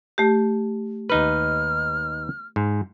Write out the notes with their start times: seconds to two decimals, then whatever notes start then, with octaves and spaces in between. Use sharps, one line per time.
0.18 A3 G4
1.10 D#2 D#4 B4 F6
2.56 G#2